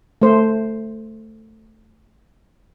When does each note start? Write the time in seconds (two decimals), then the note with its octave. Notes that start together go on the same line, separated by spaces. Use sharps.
0.22 A3 C5